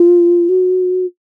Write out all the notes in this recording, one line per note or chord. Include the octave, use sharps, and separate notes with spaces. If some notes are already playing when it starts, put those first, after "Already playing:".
Already playing: F4
F#4